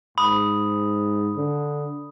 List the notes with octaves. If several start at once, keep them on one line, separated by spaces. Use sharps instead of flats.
G#2 B5 D#6
D3